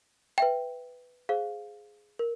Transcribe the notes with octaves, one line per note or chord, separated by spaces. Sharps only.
B4 E5 G5
G#4 C5 F5
A#4